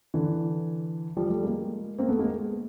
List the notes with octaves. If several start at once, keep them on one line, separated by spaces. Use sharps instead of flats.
D3 E3
F3 G3
G3 A3
G#3 A#3
A#3 C4
A3 B3
G#3 A#3